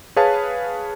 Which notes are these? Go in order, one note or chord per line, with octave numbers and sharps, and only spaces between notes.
G#4 B4 C#5 F5 A5